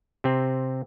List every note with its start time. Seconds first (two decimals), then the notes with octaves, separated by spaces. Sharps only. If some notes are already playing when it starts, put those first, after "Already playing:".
0.24 C3 C4